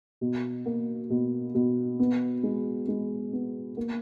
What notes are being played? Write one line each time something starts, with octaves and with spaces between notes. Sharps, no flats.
B2
A#3
B2
B2
B3
G#3
G#3
B3
A#3